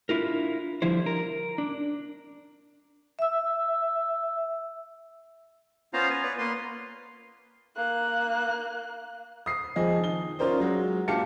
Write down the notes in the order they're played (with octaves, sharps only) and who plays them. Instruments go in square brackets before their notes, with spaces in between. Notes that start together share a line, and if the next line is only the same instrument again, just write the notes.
[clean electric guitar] D4 E4 F4 A#4
D3 F3 G3 E4 C5
A#4
D4
[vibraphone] E5 E6
[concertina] B3 C#4 F4 C5 F5 A#5
B3 B4 G#5
B4 C#5 D5
A#3 B4 C6
[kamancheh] A#3 F#6
[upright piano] D#6 C7
F2 F3 G#4 D#5 G#5
D#3 G7
C#4 F4 A#4 C5 D5
F#3 G#3
A#2 D4 G4 F5 A5 C#7